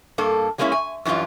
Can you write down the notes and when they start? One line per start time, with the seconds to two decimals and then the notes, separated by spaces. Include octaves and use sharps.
0.18 G2 A#3 A4
0.58 F#3 G#3 A#3 C4 C#4 E4
0.72 G#5
1.05 F#2 E3 G3 D4 F4